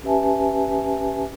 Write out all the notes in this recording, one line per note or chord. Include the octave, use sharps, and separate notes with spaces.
C#4 G4 B4 E5 G#5 A5